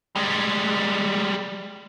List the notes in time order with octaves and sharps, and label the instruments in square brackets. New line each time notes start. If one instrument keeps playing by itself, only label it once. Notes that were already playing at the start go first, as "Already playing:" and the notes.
[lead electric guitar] G3 G#3